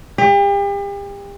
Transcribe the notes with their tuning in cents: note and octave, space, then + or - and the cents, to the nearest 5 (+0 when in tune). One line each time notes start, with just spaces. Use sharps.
G4 +40